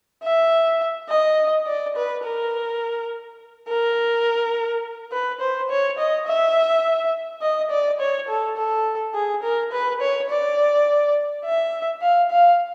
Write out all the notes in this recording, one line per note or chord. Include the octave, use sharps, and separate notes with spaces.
E5
D#5
D5
B4
A#4
A#4
B4
C5
C#5
D#5
E5
D#5
D5
C#5
A4
A4
G#4
A#4
B4
C#5
D5
E5
F5
F5